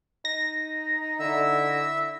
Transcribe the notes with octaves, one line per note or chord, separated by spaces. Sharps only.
D#4 A#6
D3 E4 E5 E6